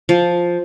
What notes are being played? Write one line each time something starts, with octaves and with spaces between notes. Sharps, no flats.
F3